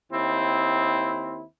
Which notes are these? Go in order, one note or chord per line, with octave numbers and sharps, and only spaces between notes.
D#2 C4 E4